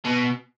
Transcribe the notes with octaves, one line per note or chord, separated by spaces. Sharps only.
B2